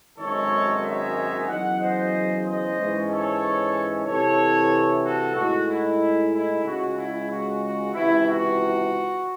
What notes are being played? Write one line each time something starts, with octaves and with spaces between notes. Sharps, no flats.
G#1 F#2 D#3 G#3 D#4 A4 C#5
C#5 E5
E2 C#3 F#3 D#5 F#5
C5 D#5
C5 D#5
G#2 E3 G#3 C#4
A4 C#5
C2 C3 E3 A4 C#5
F#4 A4
A2 G#3 D#4 F#4
E4
E4
C#2 C#3 G#3 F#4
E4
F#4
F#4
C#2 C3 E3 E4
F#4